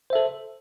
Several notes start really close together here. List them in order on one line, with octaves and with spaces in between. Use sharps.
C5 E5 A4